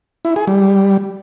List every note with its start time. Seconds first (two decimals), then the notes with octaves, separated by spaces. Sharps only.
0.25 E4
0.36 G#4
0.47 G3